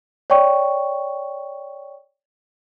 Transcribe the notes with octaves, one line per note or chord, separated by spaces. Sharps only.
C#5 D5 G5 C#6